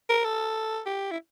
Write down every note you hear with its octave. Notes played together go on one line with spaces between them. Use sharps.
A#4
A4
G4
E4